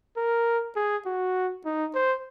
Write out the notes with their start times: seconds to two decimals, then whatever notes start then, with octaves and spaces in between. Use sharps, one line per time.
0.17 A#4
0.76 G#4
1.06 F#4
1.65 D#4
1.95 C5